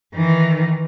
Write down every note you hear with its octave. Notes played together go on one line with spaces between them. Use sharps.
D#3 E3